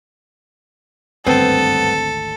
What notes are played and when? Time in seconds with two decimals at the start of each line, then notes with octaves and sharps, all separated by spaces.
1.27 G#1 D2 G2 B3 C4 A4